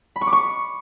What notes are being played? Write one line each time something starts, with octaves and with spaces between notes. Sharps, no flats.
B5
C#6
D6
C#6